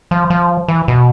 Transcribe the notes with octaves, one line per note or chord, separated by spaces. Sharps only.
F3
F3
E3
B2